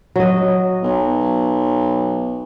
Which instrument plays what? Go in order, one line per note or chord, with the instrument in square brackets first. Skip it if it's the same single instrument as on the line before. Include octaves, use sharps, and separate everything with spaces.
[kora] F#3 D#5
[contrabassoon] B1